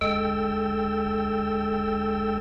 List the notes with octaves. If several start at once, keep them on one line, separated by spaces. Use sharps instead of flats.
D2 G#3 A4 G5 E6